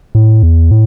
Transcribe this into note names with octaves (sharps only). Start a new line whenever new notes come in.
A2
E2
A2